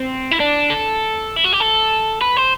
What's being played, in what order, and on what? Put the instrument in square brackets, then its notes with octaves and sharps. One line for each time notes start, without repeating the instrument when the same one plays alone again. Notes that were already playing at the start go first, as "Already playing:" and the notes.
Already playing: [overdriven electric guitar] C4
E4
D4
A4
E4
F#4
G4
A4
B4
C5